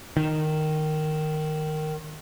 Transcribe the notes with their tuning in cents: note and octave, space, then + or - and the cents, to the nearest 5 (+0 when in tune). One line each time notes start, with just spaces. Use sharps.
D#3 -10